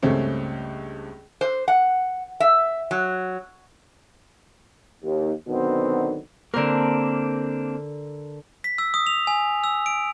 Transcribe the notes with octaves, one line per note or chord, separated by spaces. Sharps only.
C#2 G2 A3 C4 C#4
C5
F#5
E5
F#3
D#2
B2 D3 D#3 F#3 B3 C4
D3 A#3 C4 D4 A#4
B6
E6
D#6
F7
G#5
E6
D7